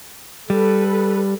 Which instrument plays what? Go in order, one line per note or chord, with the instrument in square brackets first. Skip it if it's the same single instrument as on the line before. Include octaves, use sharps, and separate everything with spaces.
[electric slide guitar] G3 [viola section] A4 B4